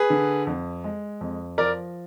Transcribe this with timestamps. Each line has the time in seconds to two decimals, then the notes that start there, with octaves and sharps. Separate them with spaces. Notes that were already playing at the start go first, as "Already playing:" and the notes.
Already playing: G#4 B4
0.10 D3
0.47 F2
0.84 G#3
1.21 F2
1.58 F3 A#4 D5